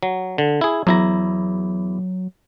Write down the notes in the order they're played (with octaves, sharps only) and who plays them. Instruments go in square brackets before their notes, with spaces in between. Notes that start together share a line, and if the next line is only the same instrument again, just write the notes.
[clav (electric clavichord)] F#3
D3
E4 G#4
[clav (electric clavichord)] E2 E4 A#5 [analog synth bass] F#3